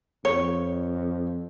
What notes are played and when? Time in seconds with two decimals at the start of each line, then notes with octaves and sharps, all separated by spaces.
0.25 F2 C#5